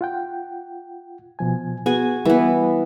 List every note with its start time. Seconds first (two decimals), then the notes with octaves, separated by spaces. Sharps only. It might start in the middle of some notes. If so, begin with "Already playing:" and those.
0.01 F4 F#5 G5
1.39 B2 F3 G#5
1.86 B3 F#4 G#4 G#5
2.25 E3 G3 B3